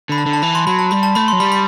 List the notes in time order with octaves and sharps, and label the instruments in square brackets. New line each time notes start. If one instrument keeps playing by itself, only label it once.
[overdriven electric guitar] D3 [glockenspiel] B5
[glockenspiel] A5
[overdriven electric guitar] D3
[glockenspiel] A5
[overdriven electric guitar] E3 [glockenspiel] B5
[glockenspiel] C6
[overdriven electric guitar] F#3 [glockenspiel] B5
[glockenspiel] A5
[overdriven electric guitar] G3 [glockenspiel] B5
[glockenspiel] A5
[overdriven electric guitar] A3 [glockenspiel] B5
[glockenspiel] C6
[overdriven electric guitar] F#3
[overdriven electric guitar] G3 [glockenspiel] B5
[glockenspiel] B5